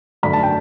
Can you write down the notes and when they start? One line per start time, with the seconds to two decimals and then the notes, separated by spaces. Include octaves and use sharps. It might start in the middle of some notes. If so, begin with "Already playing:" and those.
0.23 F#2 D3 A3 B5
0.33 A5
0.43 G5